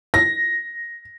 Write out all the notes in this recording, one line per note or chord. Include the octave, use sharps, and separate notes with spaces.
A#6